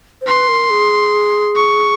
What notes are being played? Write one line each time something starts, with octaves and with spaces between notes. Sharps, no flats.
C5
B4 C6
A#4
G#4
C#6